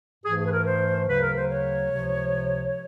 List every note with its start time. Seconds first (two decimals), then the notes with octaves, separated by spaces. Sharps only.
0.25 G#2 E3 A3 G#4
0.38 G#4
0.47 B4
0.52 A#4
0.66 C5
1.08 D2 C#3 F#3 B4
1.22 A#4
1.36 C5
1.49 C#5
1.91 C#2 C3 F3